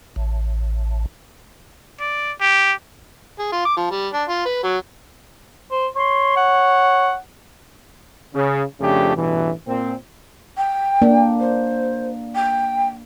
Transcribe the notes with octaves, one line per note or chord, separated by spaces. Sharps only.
A1
D5
G4
G#4
F4
D6
F3
G3
D4
F4
B4
F#3
C5
C#5 C6
F#5
C#3
F2 C#3 F3 A3 D4 G4
A1 G2 B2 E3
A#2 C4
G5
A#3 D4
C5
G5